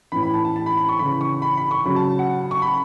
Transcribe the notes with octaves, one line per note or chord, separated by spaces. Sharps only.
A2 E3 B5
B5
A5
A5
A5
B5
B5
C#6
C#3 E3 B5
C#6
B5
B5
C#6
C#3 F#3 B5
A5
F#5
C#6
B5